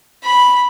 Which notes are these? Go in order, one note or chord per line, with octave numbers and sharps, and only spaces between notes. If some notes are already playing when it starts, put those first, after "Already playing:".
B5